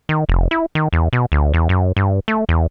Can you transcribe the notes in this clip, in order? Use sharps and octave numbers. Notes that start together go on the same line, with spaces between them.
D#3
F1
E4
D#3
E2
B2
D2
E2
F#2
G2
A3
E2